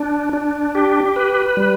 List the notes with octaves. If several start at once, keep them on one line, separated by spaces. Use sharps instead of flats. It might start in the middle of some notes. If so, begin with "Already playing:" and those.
Already playing: D4
D4
G4
B4
G3